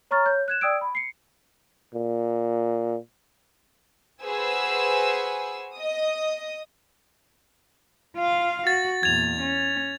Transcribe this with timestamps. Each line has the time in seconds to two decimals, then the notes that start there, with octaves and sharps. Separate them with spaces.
0.11 C#5 A#5 C#6 F6 A6
0.26 C#5 G6
0.48 F#6 G#6 E7
0.61 D5 G5 D#6 E6 G#6 D7
0.81 B5
0.95 C7 C#7
1.94 A#2
4.22 F#4 G#4 B4 C5 G#5 E6
5.76 D#5 D#6
8.18 F4 F5
8.67 F#4 A6
9.03 E2 A#2 G#6 F7
9.40 C#4